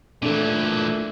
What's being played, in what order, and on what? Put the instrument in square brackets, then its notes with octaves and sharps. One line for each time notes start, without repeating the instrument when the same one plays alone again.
[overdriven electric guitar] A#2 E3 [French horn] A3 [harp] D4 A4